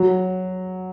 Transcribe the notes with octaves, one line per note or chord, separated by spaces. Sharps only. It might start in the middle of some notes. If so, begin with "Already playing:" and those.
Already playing: F#3